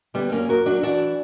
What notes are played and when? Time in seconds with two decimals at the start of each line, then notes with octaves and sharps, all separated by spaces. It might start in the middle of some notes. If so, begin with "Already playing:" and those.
0.14 D3 G3 B3
0.32 F#2 A#3 C#4
0.49 F#2 F#4 A#4
0.66 F#3 D4 F#4
0.83 E3 D4 F#4